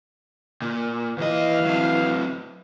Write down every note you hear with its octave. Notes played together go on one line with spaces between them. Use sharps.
A#2
D#2 E3 B4 D#5 F5
F#3 C4